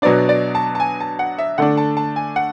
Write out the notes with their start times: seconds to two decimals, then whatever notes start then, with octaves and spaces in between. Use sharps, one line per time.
0.02 B2 F#3 B3 D4 D5
0.29 D5
0.55 A5
0.75 A5
0.80 G#5
1.00 A5
1.19 F#5
1.38 E5
1.58 D3 A3 D4 F#5
1.77 A5
1.97 A5
2.16 G#5
2.36 F#5